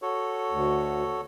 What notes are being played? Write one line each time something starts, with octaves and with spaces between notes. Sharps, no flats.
F#4 A4 C#5
D2